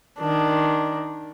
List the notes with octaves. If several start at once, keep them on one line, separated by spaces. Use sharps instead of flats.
D#3 D4